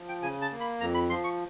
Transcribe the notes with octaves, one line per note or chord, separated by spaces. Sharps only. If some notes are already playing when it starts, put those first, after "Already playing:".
Already playing: F3
G5
C#3 G#5
A5
A#3
B5
F2 A#5
B5
F3 C6
C#6